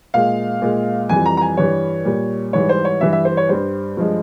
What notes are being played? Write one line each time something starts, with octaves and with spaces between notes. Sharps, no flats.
A#2 G#3 F5
A#2 G#3
F2 E3 G3 G#5
A#5
A#5
G#5
G2 E3 G3 C#5
A#2 G3
G#2 E3 G3 C#5
C5
C#5
G2 E3 G3 E5
E5
C5
C#5
G2 G3 C5
G2 F3 G#3